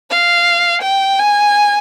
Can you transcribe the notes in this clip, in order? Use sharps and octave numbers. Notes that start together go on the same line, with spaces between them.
F5
G5
G#5